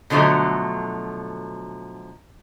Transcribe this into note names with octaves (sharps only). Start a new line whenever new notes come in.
B2 D3 F3 F#3 A3